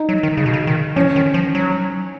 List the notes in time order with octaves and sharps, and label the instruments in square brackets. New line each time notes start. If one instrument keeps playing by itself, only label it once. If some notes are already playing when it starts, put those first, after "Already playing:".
Already playing: [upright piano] D#4
[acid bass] F#3
D#3
C#3
B2
C#3
D#3
[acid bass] F3 [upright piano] C#4
[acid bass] D#3
F3
F#3